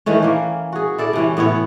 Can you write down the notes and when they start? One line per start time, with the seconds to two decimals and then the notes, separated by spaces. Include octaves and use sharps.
0.06 D#3 E3 A3 C#4
0.23 E3 A#3
0.72 F#4 G#4
0.98 E4 A4 D5
1.13 C3 E3 C#4
1.37 A2 B3 E4 C#5